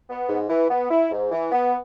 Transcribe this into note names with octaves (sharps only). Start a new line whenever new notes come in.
B3
G#2
E3
B3
E4
G#2
E3
B3